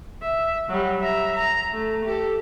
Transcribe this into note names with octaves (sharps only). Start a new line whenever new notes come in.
E5
F#3 G3
E5 A#5
A#5
A3
G4 A4